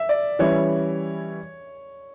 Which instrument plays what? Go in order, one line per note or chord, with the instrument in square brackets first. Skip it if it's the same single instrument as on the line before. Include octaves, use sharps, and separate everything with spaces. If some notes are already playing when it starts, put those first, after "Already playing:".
Already playing: [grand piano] E5
D5
[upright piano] E3 G3 C#4 E4 [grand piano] C#5